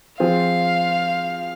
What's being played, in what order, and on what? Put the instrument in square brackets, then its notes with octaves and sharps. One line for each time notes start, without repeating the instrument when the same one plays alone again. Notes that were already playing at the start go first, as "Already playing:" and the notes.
[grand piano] F3 C4 F4 G#4 [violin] F5